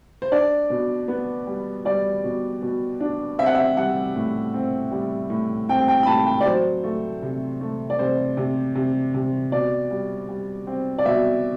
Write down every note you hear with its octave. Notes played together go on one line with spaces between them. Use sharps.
C5
D4 D5
B2
B3
G3
G3 D5
B2
B2
D4
C4 E5
F#5
E5
G3 F#5
A2
C4
G3
A2
C4 G5
G5
B5
A2 A5
G5
D5
F#3 C5
A3
C3
A3
D5
C3 C5
C3
C3
C3
B2 D5
G3
G3
C4
D5
B2 E5